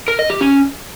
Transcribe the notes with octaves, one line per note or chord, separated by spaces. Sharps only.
A#4
D#5
G4
C#4